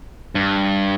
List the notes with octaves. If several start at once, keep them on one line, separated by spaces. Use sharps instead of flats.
G2